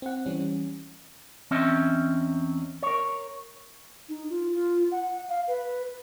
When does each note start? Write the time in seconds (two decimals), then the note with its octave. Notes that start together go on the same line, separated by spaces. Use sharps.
0.02 C4 F#5
0.26 E3 G3 C#4
1.51 E2 C4 C#4 D#5 E5
2.83 A#4 C#5
4.09 D#4
4.30 F4
4.53 F4
4.91 F#5
5.29 F5
5.48 B4